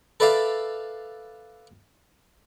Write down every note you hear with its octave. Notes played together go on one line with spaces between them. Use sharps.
A4 B4 D5 E5 F5